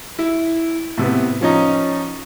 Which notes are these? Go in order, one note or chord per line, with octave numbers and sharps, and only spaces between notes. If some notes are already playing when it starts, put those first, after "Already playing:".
E4
A2 C3 B3
F3 C#4 D#4